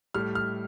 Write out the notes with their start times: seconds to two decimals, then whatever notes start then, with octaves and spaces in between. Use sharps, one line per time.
0.14 A2 G3 F6
0.35 F6